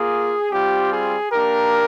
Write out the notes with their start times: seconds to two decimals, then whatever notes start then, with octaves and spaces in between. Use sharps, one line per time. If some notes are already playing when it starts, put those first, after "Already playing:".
Already playing: A#3 F4 G#4
0.52 G3 C4 F4 G4
0.91 G#4
1.31 A#3 D4 G4 A#4